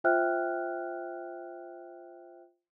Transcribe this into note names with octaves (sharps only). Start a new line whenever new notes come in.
F4 C5 E5 G5 F6 F#6